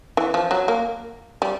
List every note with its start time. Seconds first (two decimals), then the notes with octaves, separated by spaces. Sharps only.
0.17 E3
0.34 F3
0.51 F#3
0.68 A#3
1.42 G3